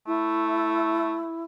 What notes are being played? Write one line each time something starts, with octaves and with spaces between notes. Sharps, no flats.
A3 E4